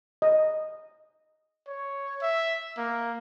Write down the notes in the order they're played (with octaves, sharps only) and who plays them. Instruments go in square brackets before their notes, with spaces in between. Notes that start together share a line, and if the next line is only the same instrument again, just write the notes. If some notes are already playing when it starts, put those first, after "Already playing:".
[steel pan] D#5
[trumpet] C#5
E5
A#3